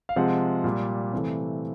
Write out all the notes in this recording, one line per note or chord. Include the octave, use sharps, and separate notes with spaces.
F5
C3 F3 G#3 F#5
A#2 G3
C3 E3 A3